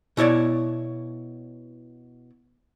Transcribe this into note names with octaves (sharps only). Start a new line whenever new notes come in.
B2 E4 C#5 D5